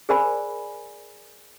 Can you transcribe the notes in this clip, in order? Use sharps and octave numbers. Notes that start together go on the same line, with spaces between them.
G#4 A#4 C5 D5 G#5 B5